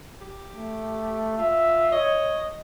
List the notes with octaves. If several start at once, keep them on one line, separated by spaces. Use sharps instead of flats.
G4
A3
F4 E5
C#5 D#5